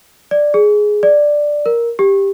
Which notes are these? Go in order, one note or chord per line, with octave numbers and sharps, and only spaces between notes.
D5
G#4
D5
A#4
G4